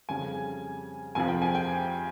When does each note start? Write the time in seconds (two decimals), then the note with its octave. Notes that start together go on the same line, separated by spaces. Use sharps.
0.09 F2 C#3 G3 G#5
1.15 F2 C3 F3 G#5
1.28 G5
1.42 G#5
1.55 G5